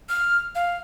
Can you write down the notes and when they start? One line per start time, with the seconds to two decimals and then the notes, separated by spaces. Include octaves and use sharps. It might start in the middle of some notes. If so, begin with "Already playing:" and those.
0.09 F6
0.55 F5